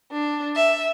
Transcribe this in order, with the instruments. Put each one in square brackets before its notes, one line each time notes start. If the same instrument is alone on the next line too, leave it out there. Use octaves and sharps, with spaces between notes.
[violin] D4
E5